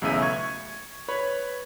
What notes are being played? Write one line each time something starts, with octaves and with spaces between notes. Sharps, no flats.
B1 E2 C#3 A3 E5 D#7
C#6 G#6
B4 C#5 B5